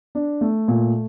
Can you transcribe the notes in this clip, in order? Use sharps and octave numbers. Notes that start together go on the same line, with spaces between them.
D4
A3
A#2